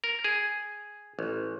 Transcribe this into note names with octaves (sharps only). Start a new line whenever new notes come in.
A#4
G#4
A1